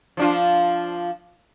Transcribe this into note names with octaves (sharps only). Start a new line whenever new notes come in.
F3 D4 F4